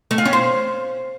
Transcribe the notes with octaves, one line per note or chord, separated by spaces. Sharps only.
A3
F4
C#4
C5